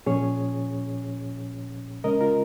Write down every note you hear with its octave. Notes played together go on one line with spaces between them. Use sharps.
A#2 F3 C#4 G#4 C#5
C#3 G#3 C#4 A#4 D#5
F4 A#4